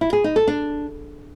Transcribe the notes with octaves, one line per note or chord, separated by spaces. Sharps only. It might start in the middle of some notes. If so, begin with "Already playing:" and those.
E4
G#4
D#4
A4
D4